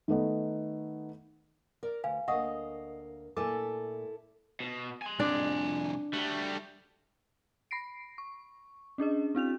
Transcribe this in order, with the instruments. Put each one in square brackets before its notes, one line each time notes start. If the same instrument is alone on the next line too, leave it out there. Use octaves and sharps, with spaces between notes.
[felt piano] D#3 A3 B3 D#4
[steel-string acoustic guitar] A#4 [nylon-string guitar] D5
[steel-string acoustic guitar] D2 [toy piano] B4 F5 G#5
[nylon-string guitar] D2 A#3 [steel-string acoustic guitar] D#5 [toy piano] F#5 C#6 D#6
[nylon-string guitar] A#2 A3 G#5 [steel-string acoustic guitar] E4 A4 [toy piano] D6
[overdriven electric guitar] B2
G#5 C6
[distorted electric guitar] C2 F2 [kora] D4
[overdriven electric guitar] G3 [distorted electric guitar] A3 F#4
[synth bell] B5 A#6 C7 D7
C#6
C#4 D4 G#4 D#5
C4 E4 F#4 F7